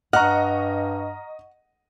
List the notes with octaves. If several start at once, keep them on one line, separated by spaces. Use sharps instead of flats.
G2 D#5 F#5 A#5 C#6 F6